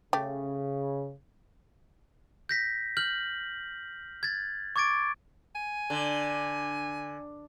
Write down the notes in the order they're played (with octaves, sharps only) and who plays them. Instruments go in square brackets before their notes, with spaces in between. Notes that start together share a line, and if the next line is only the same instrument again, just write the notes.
[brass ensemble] C#3 [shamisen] A3 G4
[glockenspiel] G6 A#6 B6
F6 G6 F#7
G#6 A6
C#6 D6 G#6 A6 D7
[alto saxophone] G#5
[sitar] D3